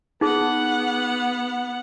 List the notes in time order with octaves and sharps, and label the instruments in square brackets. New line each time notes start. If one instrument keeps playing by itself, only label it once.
[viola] B3 F#5 [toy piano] D#4 G#4